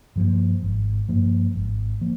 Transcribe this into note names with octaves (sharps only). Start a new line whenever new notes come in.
G2 F3 A#3
G#1
G2 F3 A#3
G#1
F3 A#3